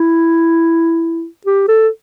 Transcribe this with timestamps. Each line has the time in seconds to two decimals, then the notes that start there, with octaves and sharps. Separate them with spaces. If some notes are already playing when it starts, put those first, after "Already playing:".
Already playing: E4
1.46 G4
1.68 A4